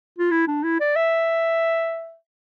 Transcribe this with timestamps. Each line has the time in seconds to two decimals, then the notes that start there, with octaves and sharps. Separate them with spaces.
0.19 F4
0.31 E4
0.47 D4
0.64 E4
0.80 D5
0.96 E5